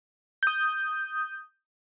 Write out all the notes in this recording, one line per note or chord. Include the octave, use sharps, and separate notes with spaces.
D#6 G6